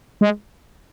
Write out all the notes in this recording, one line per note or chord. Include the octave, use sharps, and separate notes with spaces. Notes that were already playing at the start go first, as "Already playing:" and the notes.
G#3